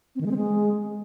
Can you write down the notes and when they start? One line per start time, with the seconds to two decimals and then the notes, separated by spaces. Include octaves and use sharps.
0.16 C4
0.21 D#3
0.26 G#3
0.31 C4
0.36 G#3